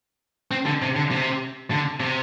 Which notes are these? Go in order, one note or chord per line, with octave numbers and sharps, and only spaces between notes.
C4
D3
C3
D3
C3
D3
C3